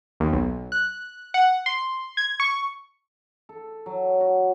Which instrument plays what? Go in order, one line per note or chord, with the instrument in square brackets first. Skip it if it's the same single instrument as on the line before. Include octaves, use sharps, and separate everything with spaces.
[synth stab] D#2
B1
F#6
F#5
C6
G#6
C#6
[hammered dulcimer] A4
F#3
F#4